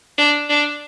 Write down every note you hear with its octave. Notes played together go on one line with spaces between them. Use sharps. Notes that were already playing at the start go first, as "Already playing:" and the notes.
D4
D4